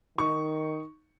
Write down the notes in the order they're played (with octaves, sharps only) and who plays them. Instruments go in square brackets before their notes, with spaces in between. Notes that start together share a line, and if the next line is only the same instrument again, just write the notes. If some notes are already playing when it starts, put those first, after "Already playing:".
[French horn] D#3 [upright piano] D#4 C#6